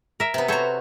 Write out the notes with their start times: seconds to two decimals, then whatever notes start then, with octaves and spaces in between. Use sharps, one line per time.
0.20 A#4 E5
0.34 C3 B3
0.48 F#4 A4 C5 C#5 A#5